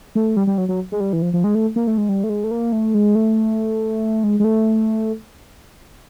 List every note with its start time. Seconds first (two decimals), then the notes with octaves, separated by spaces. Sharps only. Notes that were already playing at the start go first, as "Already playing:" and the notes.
0.15 A3
0.37 G3
0.47 G3
0.58 F#3
0.69 F#3
0.92 G#3
1.00 G3
1.13 E3
1.22 F3
1.33 F3
1.44 G#3
1.55 A3
1.76 A#3
1.87 A3
1.98 G#3
2.09 G3
2.24 A3
2.29 G#3
2.44 A3
2.51 A#3
2.72 A3
2.94 G#3
3.15 A3
4.24 G#3
4.40 G#3
4.44 A3